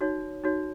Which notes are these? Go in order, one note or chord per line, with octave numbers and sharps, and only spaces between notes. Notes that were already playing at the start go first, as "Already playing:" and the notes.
D#4 F#4 C#5
D#4 F#4 C#5